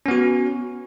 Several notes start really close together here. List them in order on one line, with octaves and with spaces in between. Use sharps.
C#4 B3 F#4